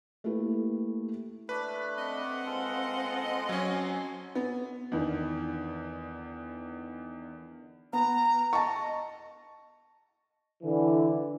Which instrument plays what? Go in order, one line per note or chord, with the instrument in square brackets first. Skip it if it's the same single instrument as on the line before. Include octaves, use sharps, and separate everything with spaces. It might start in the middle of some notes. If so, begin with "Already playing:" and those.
[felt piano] A3 A#3 E4 G4 A4 B4
[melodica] A3 D4 B5 [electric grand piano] B4
[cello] C4 F#5 [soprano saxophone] D#5
[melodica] G#3 F4 A4
[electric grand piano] F#3 C#4 [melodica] G#5 C6
[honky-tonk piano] B3
[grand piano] E2 D3 D#3
[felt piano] B3 [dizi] A#5
[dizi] D#5 [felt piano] A5 C#6
[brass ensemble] D3 E3